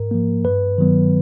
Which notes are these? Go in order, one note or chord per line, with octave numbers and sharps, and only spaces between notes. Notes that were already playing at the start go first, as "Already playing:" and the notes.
Already playing: G#2 A#4
F3 A#3
G2 B4
D#3 F#3 B3